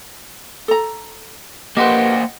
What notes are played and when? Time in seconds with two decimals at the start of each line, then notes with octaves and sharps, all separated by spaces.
0.68 A4 A#5
1.77 A#3 G4 B4 C5 D#5 F#5 G5